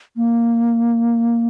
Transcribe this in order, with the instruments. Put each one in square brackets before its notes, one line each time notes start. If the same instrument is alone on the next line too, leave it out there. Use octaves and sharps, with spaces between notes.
[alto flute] A#3